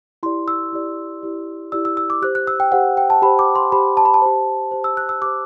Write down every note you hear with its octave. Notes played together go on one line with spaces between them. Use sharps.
E4 G4 D5 C6
E6
E4 G4 D5
E4 G4 D5
E4 G4 D5 E6
E6
E6
D6
G4 C5 F#6
F#6
E6
G5
G4 C5 F#5
G5
A5
G4 C5 B5
D6
C6
G4 C5 B5
A5
B5
A5
G4 C5
G4 C5
E6
F#6
E6
G4 C5 D6